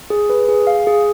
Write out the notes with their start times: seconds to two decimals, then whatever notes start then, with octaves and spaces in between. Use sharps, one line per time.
0.10 G#4
0.30 B4
0.49 G#4
0.67 F5
0.87 G#4